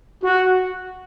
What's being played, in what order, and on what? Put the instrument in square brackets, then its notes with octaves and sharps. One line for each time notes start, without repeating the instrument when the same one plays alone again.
[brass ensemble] F#4